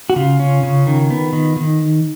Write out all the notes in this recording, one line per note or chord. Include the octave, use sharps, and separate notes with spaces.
F#4
C#3 F4
C#4
C#3
D#3
B3
D#3
D#3